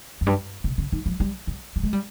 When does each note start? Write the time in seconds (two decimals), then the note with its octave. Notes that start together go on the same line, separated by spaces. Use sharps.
0.21 F2
0.26 G2
0.64 C3
0.78 C#3
0.92 D#3
1.06 F3
1.20 G3
1.47 G3
1.76 G3
1.83 G#3
1.93 G3